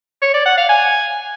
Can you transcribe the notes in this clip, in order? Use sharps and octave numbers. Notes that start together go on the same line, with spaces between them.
C#5
D5
F#5
F5
G#5